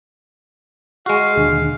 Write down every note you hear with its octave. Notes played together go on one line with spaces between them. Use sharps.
G#3 F#4 G#4 F5
D#2 B2 D3 D4